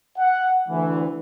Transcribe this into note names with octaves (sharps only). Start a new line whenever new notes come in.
F#5
D2 E3